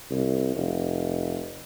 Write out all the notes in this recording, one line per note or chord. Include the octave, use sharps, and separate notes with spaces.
C2
F1